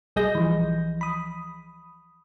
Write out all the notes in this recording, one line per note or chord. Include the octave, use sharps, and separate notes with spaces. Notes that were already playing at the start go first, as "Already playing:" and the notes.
B1 G3 G#4 D#5 G6 A#6
E3 F3
B5 D#6